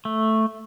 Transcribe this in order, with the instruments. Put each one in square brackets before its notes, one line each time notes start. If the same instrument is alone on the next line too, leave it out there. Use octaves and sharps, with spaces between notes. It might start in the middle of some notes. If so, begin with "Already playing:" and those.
[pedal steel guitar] A3